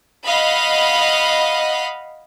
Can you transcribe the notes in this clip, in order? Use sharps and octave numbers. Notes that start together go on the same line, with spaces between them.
D#5 F5 F#5 B5